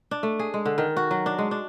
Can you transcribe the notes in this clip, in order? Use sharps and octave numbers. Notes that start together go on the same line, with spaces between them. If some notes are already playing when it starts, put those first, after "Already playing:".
D4
A3
G#4
G#3
D3
D#3
F#4
F#3
D4
G#3
D4